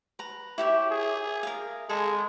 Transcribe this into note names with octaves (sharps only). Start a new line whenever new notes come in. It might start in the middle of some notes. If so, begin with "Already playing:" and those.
B4 A#5
E4 G4 C#5 E5
G#4
A#4 F5
G#3 G#4 A4 A#5